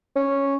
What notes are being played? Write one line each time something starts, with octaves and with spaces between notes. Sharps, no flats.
C#4